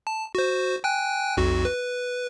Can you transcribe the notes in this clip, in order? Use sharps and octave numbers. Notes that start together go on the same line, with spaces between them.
A5
F#4 C5
G5 G#5 F#6
B1 F2 F#4
B4